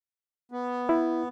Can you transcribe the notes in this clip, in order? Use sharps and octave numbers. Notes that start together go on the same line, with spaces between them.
B3
E4